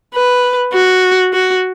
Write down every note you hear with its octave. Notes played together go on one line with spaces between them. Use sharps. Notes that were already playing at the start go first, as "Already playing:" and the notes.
B4
F#4
F#4